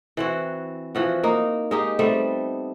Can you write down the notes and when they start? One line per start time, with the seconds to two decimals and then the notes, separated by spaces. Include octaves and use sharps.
0.17 E3 C4 F#4
0.95 E3 F3 F#4
1.23 A#3 D#4
1.71 G#3 D#4 G4
1.99 G3 A3 B3 C4